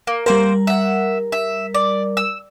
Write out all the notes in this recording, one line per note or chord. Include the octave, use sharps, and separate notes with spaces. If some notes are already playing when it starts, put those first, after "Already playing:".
A#3
G3 A#3 A#4 C5
E5 F#5
E5
D5
E6